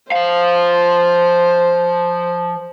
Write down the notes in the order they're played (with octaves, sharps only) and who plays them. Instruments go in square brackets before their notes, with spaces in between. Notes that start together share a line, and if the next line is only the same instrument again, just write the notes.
[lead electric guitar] F3 F5 [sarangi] C5